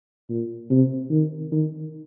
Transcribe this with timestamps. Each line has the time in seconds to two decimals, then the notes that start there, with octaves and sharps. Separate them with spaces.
0.29 A#2
0.70 C3
1.10 D#3
1.52 D#3